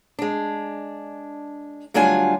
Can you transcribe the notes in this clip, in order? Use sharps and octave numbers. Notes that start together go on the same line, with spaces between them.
G#3 D4
D2 F#3 G3 D4 F4 G#5